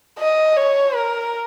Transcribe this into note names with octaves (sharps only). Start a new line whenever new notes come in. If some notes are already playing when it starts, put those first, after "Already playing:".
D#5
C#5
A#4